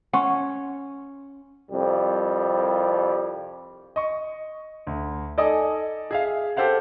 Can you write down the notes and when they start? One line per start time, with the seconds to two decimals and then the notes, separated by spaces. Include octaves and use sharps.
0.13 C#4 F#5 C6 C#6
1.72 C2 F2 G3
3.96 D#5 C#6
4.87 D2
5.37 D#4 A4 D5 D#5 G#5 D#6
6.11 G#4 E5 F5
6.57 G4 A4 C5 F5 F#5